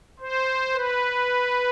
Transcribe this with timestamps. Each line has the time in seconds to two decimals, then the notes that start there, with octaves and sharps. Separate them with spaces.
0.20 C5
0.74 B4